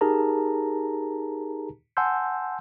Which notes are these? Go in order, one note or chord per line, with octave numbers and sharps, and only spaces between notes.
D#4 G4 G#4 A#4 A5 A#5
F#5 G#5 A5 C6 E6 G6